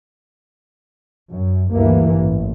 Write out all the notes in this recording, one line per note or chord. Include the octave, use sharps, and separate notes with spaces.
F#2
D2 G2 E3 A#3
A1